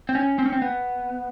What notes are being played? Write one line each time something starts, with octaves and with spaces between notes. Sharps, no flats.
C4
C#4
C4
C#4
C4
B3